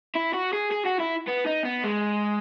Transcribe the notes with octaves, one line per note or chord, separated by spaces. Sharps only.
E4
F#4
G#4
G#4
F#4
E4
B3
D#4
B3
G#3